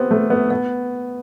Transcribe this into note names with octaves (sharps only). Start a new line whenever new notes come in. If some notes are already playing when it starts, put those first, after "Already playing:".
Already playing: B3 C4 G4
A3
B3
B3